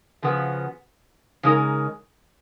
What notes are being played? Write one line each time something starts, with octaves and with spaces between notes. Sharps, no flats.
C#3 F3 B3 F#4
C#3 G#3 D#4 A#4